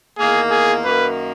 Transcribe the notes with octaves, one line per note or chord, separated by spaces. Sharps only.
E2 D#3 A#3 G#4
G#4
F#2 D#3 A#3 B4